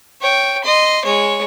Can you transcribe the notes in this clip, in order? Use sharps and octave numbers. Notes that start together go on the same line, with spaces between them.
C#5 G5
D#5 C6
G#3 C#5